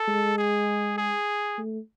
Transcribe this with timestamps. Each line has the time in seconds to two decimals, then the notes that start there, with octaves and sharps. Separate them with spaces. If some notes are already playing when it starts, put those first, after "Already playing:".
Already playing: A4
0.08 G#3
0.38 G#4
0.97 G#4
1.58 A3